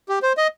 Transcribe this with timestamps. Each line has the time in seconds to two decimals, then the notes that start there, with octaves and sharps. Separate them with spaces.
0.09 G4
0.23 C5
0.37 D#5